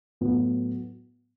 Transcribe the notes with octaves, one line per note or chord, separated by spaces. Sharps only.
A2 F#3 B3